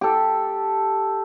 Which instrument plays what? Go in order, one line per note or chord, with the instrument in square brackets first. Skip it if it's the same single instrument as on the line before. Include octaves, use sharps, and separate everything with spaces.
[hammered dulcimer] G4 A4